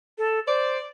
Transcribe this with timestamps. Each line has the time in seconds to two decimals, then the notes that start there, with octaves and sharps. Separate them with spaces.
0.18 A4
0.47 C5 D5